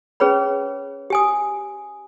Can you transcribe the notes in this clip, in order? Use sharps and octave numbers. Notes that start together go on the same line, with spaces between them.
C#4 G#4 B4 C#5 B5
G4 G#5 D#6